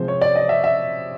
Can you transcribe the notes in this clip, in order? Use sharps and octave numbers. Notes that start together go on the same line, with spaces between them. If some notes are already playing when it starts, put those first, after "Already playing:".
Already playing: C3 F3 G#3 C5
C#5
D5
D#5
E5
E5